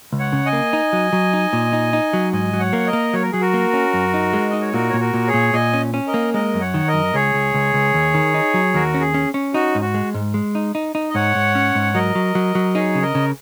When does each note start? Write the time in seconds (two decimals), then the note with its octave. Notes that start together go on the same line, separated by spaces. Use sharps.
0.13 C#2
0.19 C#5 F#5
0.33 C#3
0.46 D#5 G#5
0.53 A#3
0.73 D#4
0.93 F#3
1.13 F#3
1.33 D#4
1.53 A#2
1.73 D#4
1.93 D#4
2.13 F#3
2.33 G#2 D#5 G#5
2.53 F#3
2.59 C#5 F#5
2.73 A#3
2.86 A#4 D#5
2.93 A#3
3.13 F#3 C#5
3.22 A#4
3.32 F#3 G#4
3.41 F#4 A#4
3.54 A#3
3.74 C#4
3.94 F#2
4.14 D#4
4.33 G#3
4.50 D#4 D#5
4.61 C#5
4.73 A#2 F#4 A#4
4.90 A#2 C#5
5.00 F#4 A#4
5.14 A#2
5.27 G#4 C#5
5.34 A#2
5.53 A#2 D#5 G#5
5.73 C#4
5.94 C#4
6.07 A#4 D#5
6.14 A#3
6.34 G#3 A#4 D#5
6.54 F#2
6.60 C#5 F#5
6.74 D#3
6.88 A#4 D#5
6.94 F#2
7.14 C#2 G#4 C#5
7.34 C#2
7.54 C#2
7.74 C#2
7.94 D#2
8.14 D#3
8.34 D#4
8.54 F#3
8.74 D#2 F#4 A#4
8.94 C#4
9.01 G#4
9.14 C#4
9.34 C#4
9.54 D#4 F#4
9.75 G#2
9.81 F#4
9.94 G#3
10.14 G#2
10.34 G#3
10.55 D#4
10.75 D#4
10.95 D#4
11.10 D#5
11.15 G#2 C#5 F#5
11.35 G#2
11.55 C#4
11.75 G#2
11.95 F#3 A#4 D#5
12.15 F#3
12.35 F#3
12.55 F#3
12.74 D#4 G#4 C#5
12.95 C#3
13.02 A#4 D#5
13.15 C#3